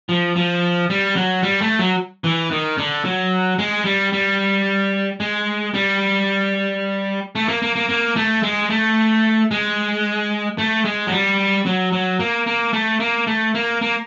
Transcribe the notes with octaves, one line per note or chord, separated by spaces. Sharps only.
F3
F3
G3
F#3
G3
A3
F#3
E3
D#3
D3
F#3
G#3
G3
G3
G#3
G3
A3
A#3
A#3
A#3
A#3
A3
G#3
A3
G#3
A3
G#3
F#3
G3
F#3
F#3
A#3
A#3
A3
A#3
A3
A#3
A#3